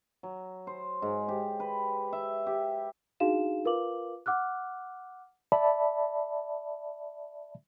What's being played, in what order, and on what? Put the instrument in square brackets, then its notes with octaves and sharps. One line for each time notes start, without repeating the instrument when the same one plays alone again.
[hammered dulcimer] F#3
C5
G#2
G4
B4
E5
G4
[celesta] D4 D#4 F#4 G#4 F5 E7
F4 A#4 B4 F5 D6 F#7
F#5 D6 F6 F#6
[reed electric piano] D5 E5 A5 B5